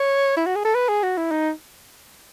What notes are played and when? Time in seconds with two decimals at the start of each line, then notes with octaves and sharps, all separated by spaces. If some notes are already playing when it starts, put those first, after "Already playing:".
Already playing: C#5
0.37 E4
0.46 F#4
0.55 G#4
0.65 A4
0.75 B4
0.89 G#4
1.03 F#4
1.17 E4
1.31 D#4